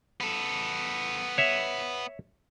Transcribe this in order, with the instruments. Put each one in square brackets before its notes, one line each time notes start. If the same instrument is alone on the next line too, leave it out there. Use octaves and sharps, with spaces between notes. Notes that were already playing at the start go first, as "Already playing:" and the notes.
[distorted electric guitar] B3 A4
[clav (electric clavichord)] C#5 E5